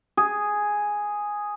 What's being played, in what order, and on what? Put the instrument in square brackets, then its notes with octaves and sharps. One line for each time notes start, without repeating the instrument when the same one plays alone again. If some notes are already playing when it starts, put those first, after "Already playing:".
[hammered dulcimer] G#4